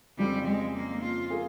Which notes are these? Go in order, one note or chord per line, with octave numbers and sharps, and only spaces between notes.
F2 C#3 F3 G3 C4
G#3
A#3
F4
A#3 F4 G#4